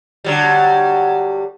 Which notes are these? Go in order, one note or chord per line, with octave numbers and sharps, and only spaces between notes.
D3 F#3 G3